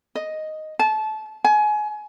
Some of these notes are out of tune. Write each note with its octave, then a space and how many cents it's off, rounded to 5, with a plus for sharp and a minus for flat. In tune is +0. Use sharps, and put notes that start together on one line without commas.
D#5 +0
A5 -25
G#5 +25